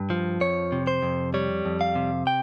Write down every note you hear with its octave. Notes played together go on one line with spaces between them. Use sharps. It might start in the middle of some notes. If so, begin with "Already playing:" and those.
Already playing: G2
F3
F2 C#5
C3
C5
F2
G3 C#5
F2
F5
C3
G5